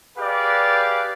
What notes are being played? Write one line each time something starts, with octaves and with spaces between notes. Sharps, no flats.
G4 G#4 B4 D5 F5